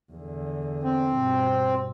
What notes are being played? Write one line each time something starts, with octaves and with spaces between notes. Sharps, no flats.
E2 D3
C4
G2 B2